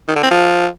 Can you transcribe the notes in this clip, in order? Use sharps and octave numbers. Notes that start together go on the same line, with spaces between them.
D#3
D3
C4
F3